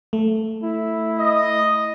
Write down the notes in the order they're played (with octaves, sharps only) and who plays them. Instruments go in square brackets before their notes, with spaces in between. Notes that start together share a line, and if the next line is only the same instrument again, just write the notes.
[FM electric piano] A3
[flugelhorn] E4
[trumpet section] D#5